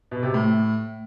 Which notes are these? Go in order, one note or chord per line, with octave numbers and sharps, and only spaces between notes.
B2
C3
A2